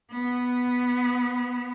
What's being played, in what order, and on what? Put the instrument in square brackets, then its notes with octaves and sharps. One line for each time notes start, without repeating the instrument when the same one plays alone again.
[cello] B3